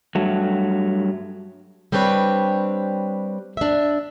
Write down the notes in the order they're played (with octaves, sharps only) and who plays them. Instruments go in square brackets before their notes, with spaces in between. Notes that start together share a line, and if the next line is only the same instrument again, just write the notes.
[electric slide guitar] G2 F#3 A3
[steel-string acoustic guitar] G3 C4 D4 B4 C#5
D4 E5